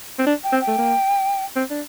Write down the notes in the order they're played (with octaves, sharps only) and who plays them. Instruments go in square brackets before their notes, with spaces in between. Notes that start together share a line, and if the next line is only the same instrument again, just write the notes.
[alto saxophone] C4
D4
[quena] G5
[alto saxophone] C4
[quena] G5
[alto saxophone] A3
A#3
C4
D4